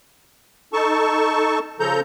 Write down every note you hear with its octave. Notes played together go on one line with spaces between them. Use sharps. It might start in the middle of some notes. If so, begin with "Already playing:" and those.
D#4 A4 A5 C#6
C#3 F3 A4 A#5 G6